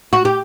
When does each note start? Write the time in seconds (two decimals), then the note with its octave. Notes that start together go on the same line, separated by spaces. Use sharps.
0.13 F#4
0.25 G4